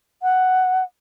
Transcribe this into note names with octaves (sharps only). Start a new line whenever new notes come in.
F#5